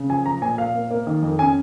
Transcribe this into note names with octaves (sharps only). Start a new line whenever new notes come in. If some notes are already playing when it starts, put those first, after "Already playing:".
Already playing: C#3
F3 G#5
F3 A#5
A#2 G#5
A#2 F5
A#3
A#3
D#3
F2
C#4 G#5